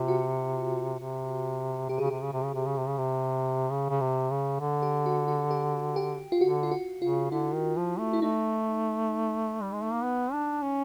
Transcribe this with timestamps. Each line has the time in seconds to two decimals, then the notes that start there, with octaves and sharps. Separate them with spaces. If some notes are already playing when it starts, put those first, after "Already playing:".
Already playing: C3 F4
0.08 F#4
0.99 C3
1.89 C3 G4
1.98 C#3 G#4
2.06 G4
2.11 C3
2.22 C#3
2.33 C3
2.44 C#3
2.55 C3
2.66 C#3
2.77 C3
2.87 C#3
2.98 C3
3.70 C#3
3.90 C#3
4.00 C3
4.30 C#3
4.60 D3
4.82 G4
5.06 F#4
5.28 F#4
5.51 G4
5.96 G4
6.32 F4
6.41 D3 F#4
6.63 F4
6.71 F#4
7.01 C#3 F4
7.31 D3 E4
7.54 D#3
7.77 F3
7.99 A3
8.13 E4
8.22 A3 D#4
9.62 G3
9.72 G#3
9.82 A3
9.92 A#3
10.02 B3
10.32 D4
10.62 C#4